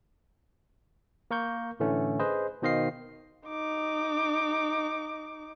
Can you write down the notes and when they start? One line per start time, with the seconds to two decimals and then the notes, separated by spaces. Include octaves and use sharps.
1.31 A#3 A#4 C#6 G6
1.80 A2 D3 E3 A3 C#4
2.19 G#4 B4 C5 D#5
2.62 B2 D#3 C5 D#5 F5 C7
3.48 D#4 D6